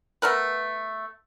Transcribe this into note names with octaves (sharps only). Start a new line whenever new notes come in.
A3 B3 A#4 B4